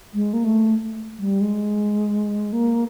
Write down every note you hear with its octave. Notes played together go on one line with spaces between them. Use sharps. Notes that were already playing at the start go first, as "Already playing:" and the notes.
G#3
A#3
A3
G3
G#3
A#3